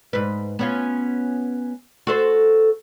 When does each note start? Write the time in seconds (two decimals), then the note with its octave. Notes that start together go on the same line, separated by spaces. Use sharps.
0.13 G#2 B4
0.59 B3 C#4 F4
2.07 F#4 A4 C5